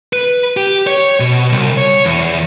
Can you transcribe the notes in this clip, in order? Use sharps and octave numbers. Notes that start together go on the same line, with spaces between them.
B4
G4
C#5
B2
C2
C#5
E2